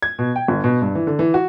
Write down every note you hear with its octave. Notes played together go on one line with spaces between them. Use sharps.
G#6
B2
G5
G1
B2
G2
E3
D3
E3
F#4